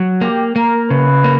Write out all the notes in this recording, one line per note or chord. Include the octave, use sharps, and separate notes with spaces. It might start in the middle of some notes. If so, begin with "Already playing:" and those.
Already playing: F#3
A#3 G4
A#3 A#4
C#3 B4
A#3